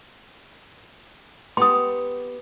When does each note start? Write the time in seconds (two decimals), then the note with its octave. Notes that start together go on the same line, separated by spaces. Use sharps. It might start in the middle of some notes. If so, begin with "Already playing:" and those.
1.57 B3 G4 C6 D#6